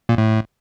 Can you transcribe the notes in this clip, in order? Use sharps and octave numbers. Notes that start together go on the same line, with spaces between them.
A#2
A2